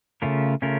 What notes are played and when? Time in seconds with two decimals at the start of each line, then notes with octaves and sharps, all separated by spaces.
0.22 C#3 A3 C#4 F4 A#4
0.62 C#3 A3 C#4 F4 A#4